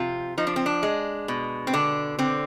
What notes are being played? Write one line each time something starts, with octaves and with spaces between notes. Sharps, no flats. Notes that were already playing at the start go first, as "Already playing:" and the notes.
Already playing: C3 F3 F4
F3 D#4
D4
C4
D4
G#3
B2
C4
D3 D4
D3 C4